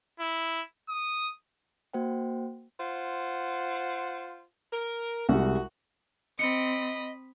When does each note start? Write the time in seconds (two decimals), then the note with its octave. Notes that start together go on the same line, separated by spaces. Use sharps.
0.20 E4
0.89 D#6
1.94 A#3 F#4 C5 F#5 G5
2.79 F4 C5 F#5
4.73 A#4
5.29 C2 G3 G#3 F#4
6.39 C4 D#5 B5 D#6 C#7